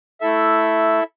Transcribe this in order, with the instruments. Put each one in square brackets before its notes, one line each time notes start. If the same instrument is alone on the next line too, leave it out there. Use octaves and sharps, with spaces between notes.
[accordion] A3 E4 A4 E5